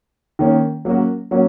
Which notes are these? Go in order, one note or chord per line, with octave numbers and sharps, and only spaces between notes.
D#3 A#3 C#4
F#3 A#3 C#4 F#4
F#3 A#3 C#4 F#4